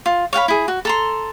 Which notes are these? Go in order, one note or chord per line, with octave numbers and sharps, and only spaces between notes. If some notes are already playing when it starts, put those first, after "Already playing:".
F4
C#5 F5 F#5 B5
E4 G#4
F#4
A4 A#5 C6